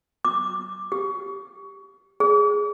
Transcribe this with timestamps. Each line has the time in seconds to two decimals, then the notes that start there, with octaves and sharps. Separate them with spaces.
0.25 D6
0.92 G4
2.20 G#4